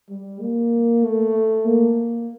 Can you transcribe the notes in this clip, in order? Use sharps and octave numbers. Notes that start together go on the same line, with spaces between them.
G3
A#3
A3
A#3